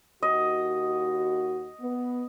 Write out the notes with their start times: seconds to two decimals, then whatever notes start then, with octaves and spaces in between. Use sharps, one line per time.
0.22 D#2 F#4 D#5
1.80 B3